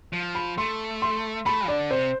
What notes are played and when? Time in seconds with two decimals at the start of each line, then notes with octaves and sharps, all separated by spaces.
0.13 F3
0.35 B5
0.58 A3 C6
1.02 C6
1.46 A3 B5
1.68 D3 D5
1.91 C3 C5